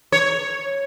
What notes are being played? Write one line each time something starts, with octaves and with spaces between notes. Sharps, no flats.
C#5